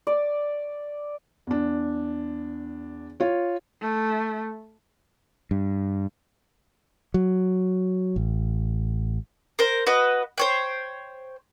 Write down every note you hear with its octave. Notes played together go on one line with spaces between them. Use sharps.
D5
E2 D4
F4 C#5
A3
G2
F#3
A1
A#4 C5
F#4 B4 D#5
C5 C#5 G5